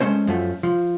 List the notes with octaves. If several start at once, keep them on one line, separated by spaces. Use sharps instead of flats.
G#3 A3 C#4 C5
F#2 F3 A3
F3